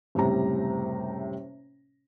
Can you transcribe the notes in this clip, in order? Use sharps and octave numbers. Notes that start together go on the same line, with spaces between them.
F#1 A2 C3 G3 A#5